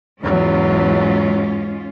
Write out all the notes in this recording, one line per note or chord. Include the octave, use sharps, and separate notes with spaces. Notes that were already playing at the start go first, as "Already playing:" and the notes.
E2 G#2 F#3 C#4 F4